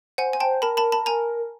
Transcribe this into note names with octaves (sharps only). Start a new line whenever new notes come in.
C5 F#5 G#5
G#5
C5 G5 A5
A#4 A5 B5
A5 B5
A5 B5
G#5 A#5